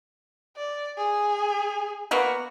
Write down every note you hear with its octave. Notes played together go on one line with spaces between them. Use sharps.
D5
G#4
A#3 B3 F#4